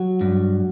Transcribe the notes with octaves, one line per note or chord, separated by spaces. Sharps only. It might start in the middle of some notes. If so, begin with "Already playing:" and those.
Already playing: F#3 F#4
G2